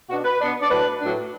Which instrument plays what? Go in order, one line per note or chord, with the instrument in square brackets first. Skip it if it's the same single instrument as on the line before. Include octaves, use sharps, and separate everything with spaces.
[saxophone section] B2 B3 D4 F#4
B4
B2 B3 D4
D5
A2 F#3 D4 B4
A2 F#3 D4